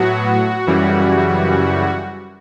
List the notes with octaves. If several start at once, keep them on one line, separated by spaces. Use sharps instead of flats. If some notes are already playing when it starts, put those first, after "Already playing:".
Already playing: A2 F#3 B3 F#4
F#2 C#3 E3 G3